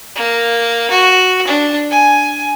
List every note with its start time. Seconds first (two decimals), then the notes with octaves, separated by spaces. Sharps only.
0.15 A#3
0.91 F#4
1.47 D4
1.90 G#5